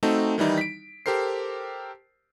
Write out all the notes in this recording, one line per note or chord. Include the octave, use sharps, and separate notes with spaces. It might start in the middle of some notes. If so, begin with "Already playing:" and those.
A3 C4 D#4 F#4 A4
D#3 E3 G3 D#4 E4
B6 D7
G4 A4 A#4 C5 C7